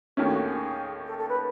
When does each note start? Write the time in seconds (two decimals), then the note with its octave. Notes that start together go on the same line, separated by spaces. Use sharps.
0.17 D#2 D#3 A3 C#4 G#4
0.30 F#4
0.43 G#4
1.06 A4
1.18 A4
1.29 B4